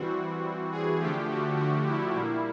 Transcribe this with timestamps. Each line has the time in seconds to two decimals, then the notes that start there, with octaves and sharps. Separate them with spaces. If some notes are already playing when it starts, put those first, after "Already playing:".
Already playing: E3 G3 C4 F#4
0.72 G#4
1.00 D3 F3 A3 G4
1.29 F#4
1.57 F#4
1.86 E4
2.13 A#2 G3 A#3 E4